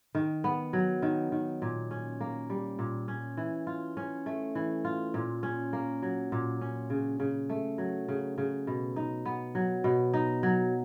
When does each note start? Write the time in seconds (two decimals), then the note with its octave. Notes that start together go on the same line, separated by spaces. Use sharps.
0.15 D#3
0.44 B3
0.73 F#3
1.02 D#3
1.32 D#3
1.62 A#2
1.91 C#4
2.20 A#3
2.50 G3
2.79 A#2
3.08 C#4
3.37 E3
3.67 F4
3.97 C#4
4.26 A3
4.55 E3
4.85 F4
5.14 A#2
5.43 C#4
5.73 A#3
6.02 F#3
6.32 A#2
6.61 C#4
6.90 C#3
7.20 C#3
7.49 A3
7.78 F#3
8.08 C#3
8.38 C#3
8.67 B2
8.96 D#4
9.25 B3
9.55 F#3
9.84 B2
10.13 D#4
10.43 F#3